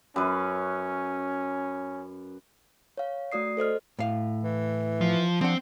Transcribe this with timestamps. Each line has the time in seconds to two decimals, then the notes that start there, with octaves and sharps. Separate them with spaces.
0.16 F#2 C#4 B4
2.98 C#5 F5
3.32 A3 F#4 D5 D#6 C7
3.57 A4 C5 D#5 F6
3.99 A2 F5
4.43 E3
5.01 F3
5.41 F3 C4 D4 F#5